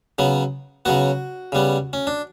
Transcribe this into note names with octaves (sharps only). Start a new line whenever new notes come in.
C#3 F#3 B3
C#3 F#3 B3 F#4
C#3 G3 B3
C#4
D4